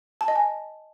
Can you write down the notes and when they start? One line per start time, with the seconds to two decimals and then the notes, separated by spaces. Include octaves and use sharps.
0.21 A5
0.28 D#5
0.36 G#5